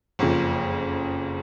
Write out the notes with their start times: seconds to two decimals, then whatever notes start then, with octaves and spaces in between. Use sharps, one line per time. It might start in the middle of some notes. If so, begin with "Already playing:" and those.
0.19 F#1 F2 C#3 F3